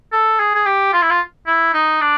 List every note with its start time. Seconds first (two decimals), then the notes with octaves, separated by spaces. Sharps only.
0.12 A4
0.40 G#4
0.55 G#4
0.66 G4
0.93 F4
1.02 E4
1.10 F4
1.47 E4
1.74 D#4
2.01 D4